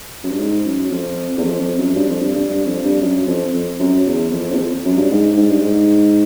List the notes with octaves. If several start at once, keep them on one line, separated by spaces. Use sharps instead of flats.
F#2
G2
G#2
F#2
F2
E2
F2
F2
F#2
G2
F2
G2
G2
G2
F2
G2
F#2
F2
F2
F#2
E2
F2
E2
F2
F#2
G2
G#2
G#2
G2
G#2